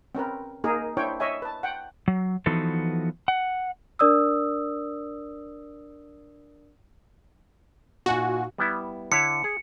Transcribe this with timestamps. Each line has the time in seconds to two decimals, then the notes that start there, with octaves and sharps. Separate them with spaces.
0.15 C4 C#4 A#4 B4
0.64 A#3 D#4 G#4 A#4
0.97 D4 E4 C5 C#5 G5
1.20 C#5 D#5 E5 G#5
1.42 B4 A5
1.63 F#5 G5
2.08 F#3
2.46 E3 F3 B3 D#4 F#4 A4
3.28 F#5
3.99 D4 A#4 D5 D#6 E6
8.06 A#2 D#4 F#4 G#5
8.58 G3 B3 E4
9.12 D3 E4 C#5 C#7
9.44 G#4